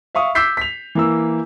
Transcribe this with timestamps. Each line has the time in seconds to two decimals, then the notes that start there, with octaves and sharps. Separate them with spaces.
0.15 E5 F5 C#6 D#6
0.35 D6 E6 G6 B6 C7
0.57 B6 F7
0.95 E3 A#3 E6